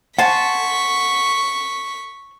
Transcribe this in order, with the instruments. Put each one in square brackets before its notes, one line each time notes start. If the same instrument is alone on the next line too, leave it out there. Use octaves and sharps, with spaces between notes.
[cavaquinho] C5 G#5 A5 [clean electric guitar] F#5 [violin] C#6 B6